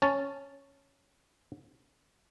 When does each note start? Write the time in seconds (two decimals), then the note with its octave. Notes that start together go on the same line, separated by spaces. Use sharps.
0.02 C#4 A5